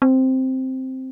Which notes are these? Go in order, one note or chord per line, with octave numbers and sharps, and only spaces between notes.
C4